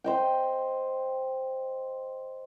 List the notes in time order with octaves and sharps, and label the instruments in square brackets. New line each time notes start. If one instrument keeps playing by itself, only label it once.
[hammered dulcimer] C5 D#5 G5